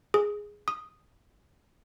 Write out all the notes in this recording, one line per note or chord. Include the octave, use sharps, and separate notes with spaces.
G#4
D#6